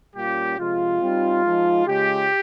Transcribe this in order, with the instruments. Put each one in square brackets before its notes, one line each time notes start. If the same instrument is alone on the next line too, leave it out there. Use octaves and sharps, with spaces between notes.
[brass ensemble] A#2 G3 A#3 C#4 F4 G4
C3 F3 G#3 F4
G3 C4 D#4
F3 G#3 D#4
C#3 G#3 C#4 F4 G4